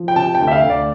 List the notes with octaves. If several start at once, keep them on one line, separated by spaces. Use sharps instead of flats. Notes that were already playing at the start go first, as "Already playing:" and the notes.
Already playing: F3
G5
C3 A5
G5
D2
E5
F5
D2
D5